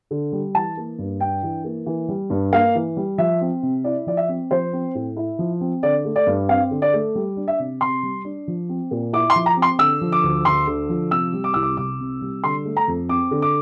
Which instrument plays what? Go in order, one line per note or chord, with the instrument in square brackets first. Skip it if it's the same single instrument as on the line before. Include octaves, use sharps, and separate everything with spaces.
[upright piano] D3
G3
E3 A5
A#3
G2
D4 G5
E3
A#3
E3
G3
G2
A#3 F5
E3
G3
F3 E5
C4
C3
E4 D5
F3 D5
E5
C4
F3 C5
C4
A2
E4
F3
C4
D3 D5
A3
D5
G2
C4 F5
D3
D5
A3
G3
D4
E5
C3
C3 C6
G3
D4
F3
C4
A#2
E4 D6
C6
F3
A#5
C4
C6
D3 E6
F3
D6
D2
D2 C6
D3
F3
C3 E6
G3
D6
C2 E6
D6
C2 D6
C3
G3
D3 C6
A3
A#5
F2
C4 D6
D3
D6